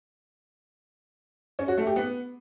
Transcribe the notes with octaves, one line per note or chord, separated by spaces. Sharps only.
C#4
F#4
A3
G4
B3